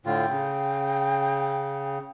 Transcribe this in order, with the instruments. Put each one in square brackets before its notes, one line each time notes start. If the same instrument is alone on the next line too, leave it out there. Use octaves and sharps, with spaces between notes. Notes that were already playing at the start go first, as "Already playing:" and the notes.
[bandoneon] A2 D3 F4 [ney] G5
[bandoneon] C#3